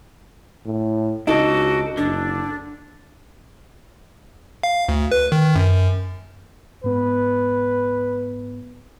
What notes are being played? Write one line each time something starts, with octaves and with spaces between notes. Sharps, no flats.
A2
C#2 D4 D#4 F#4 A4
F#1 D3 D4
F5
D2
B4
D#3
F#2
G#2 B3 B4